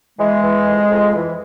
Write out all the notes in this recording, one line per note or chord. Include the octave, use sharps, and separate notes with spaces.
E3 G#3
E3
F2
F2
E3